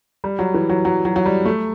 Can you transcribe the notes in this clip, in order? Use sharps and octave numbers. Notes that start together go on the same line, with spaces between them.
G3
F#3
E3
F#3
F#3
F#3
F#3
G3
A3